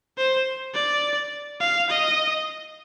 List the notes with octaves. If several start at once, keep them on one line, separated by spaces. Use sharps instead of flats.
C5
D5
F5
D#5